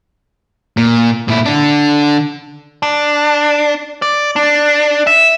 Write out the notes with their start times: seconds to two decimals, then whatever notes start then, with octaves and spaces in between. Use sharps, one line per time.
0.77 A#2
1.28 A#2 E4
1.46 D3 D4
2.83 D4
4.02 D5
4.36 D4
5.07 E5